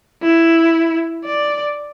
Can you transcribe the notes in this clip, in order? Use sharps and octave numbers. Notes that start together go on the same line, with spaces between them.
E4
D5